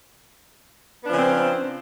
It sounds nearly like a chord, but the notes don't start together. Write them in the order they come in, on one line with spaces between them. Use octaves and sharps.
B3 D4 F3 C#3 C4